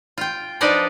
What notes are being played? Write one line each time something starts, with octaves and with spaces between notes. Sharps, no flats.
F4 G5
F3 D4 D#4 B4 D5 D#5